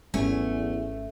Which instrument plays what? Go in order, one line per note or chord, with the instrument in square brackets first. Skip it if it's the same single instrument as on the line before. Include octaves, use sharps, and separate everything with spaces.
[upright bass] G#1 [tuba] E2 [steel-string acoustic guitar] A3 [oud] C#4